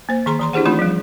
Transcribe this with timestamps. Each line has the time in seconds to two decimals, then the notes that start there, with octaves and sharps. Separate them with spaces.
0.09 A#3 C5
0.26 D#3 G#4 A#5 C6
0.39 E3 A#5 C6
0.53 D4 E4 G4 G#4 C5 F#5
0.65 E3 A3 C4 D#4 F4 B5
0.79 F3 G3